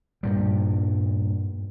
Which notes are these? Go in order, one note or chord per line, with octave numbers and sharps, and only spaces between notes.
G2 A#2 G3